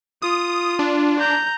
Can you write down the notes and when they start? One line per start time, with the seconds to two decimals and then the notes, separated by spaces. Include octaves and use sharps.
0.22 F4 D#6
0.79 D4
1.20 A#5 G6